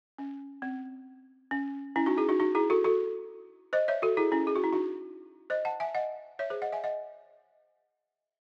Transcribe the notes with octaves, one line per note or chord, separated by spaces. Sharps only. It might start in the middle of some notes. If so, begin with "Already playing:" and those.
C#4
C4
C#4
C#4 E4
D#4 F#4
E4 G#4
D#4 F#4
D#4 F#4
E4 G#4
F#4 A4
F#4 A4
C5 D#5
C#5 E5
F#4 A4
E4 G#4
C#4 E4
G#4
F#4
E4
D#4 F#4
C5 D#5
F#5 A5
E5 G#5
D#5 F#5
C#5 E5
G#4 C5
D#5 F#5
E5 G#5
D#5 F#5